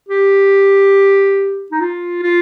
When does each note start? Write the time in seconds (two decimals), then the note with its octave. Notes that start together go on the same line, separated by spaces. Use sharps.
0.09 G4
1.72 D#4
1.80 F4
2.23 F4